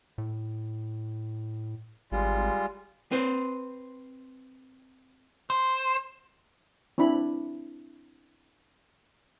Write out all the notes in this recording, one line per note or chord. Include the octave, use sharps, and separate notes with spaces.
A2
G#1 G3 G#3 F4
C4 B4 C5
C5
C4 D4 E4 B5